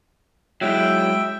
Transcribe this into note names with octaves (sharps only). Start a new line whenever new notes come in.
F#3 G#3 E4 E5 G5